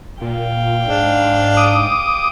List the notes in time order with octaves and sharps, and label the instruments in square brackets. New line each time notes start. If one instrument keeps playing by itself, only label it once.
[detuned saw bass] A#2 [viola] F5 G5
[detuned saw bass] G#2 [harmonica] D4
[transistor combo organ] D6 D#6